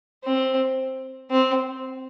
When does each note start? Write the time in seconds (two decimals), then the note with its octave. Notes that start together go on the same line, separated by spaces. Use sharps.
0.24 C4
1.31 C4